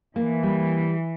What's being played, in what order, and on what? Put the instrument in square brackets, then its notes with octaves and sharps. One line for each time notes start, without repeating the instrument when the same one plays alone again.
[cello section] E3 [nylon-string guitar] A#3
[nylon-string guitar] G3